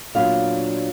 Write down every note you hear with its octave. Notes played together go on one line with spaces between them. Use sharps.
A#2 F#3 B3 D4 F5